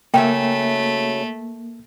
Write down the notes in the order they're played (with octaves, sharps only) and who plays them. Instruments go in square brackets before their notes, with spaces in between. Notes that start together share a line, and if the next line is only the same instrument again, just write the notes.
[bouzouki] C#3 F#3 E5 [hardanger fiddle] A3 [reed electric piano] A#3 [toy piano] G5